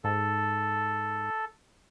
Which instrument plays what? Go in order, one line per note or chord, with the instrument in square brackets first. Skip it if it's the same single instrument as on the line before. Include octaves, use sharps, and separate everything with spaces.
[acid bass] G#2 [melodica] A4